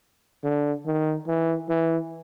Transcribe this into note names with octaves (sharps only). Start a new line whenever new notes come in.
D3
D#3
E3
E3